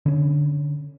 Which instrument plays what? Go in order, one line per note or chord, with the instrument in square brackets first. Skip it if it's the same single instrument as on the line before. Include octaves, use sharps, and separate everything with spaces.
[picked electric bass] D3 C#4